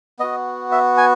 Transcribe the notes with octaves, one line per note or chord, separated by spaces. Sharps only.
B3 F#4 D#5
E5
G#5